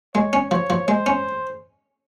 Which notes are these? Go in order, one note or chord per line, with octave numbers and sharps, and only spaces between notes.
G#3 C#5
C#4
F3 C#5
F3
G#3 C5
C#4